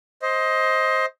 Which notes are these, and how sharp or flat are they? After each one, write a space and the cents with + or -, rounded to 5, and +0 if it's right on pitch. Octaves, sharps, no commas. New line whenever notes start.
C5 +10 D#5 +20